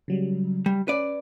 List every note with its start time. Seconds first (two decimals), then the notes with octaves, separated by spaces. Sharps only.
0.08 C#3 F#3 G3
0.66 G3
0.88 C#4 B4 D5